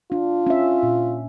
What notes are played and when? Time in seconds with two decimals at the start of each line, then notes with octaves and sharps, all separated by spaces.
0.12 D4 F4
0.47 C#4 E5
0.83 A#2